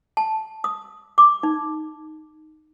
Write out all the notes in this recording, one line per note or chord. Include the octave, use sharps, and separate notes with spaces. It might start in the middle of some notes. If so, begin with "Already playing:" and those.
A5
D#6
D6
D#4